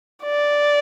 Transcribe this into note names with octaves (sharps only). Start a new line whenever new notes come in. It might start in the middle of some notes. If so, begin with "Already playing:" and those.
D5